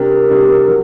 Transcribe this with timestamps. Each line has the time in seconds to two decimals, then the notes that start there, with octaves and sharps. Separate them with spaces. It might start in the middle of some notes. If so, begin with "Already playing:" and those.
Already playing: C3 G3 D4 G4 A#4
0.29 C3 G3 D4 G4
0.68 F#3